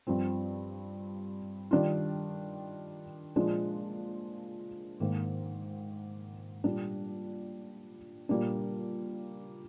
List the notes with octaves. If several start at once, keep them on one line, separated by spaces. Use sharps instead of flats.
G2 F3 C4
D#3 G3 D4 F4
A#2 F3 G#3 D4
G#2 D#3 A#3
A#2 G3 D4
A#2 G3 A#3 D4